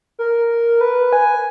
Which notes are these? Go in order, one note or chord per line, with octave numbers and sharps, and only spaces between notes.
A#4
B4
G#5